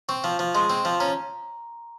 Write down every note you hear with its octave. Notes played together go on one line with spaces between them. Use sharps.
C4 C#6
F3
F3
G#3 C6
C4
F3
C#4 A#5